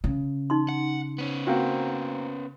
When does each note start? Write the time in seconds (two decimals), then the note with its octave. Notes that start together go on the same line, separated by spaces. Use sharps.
0.04 C#3
0.50 D#4 C6
0.69 F#5
1.18 B3 C#4
1.47 A#3 C4 F#4